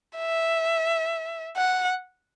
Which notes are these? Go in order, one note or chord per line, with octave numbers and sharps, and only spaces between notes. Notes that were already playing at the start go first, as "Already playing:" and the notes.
E5
F#5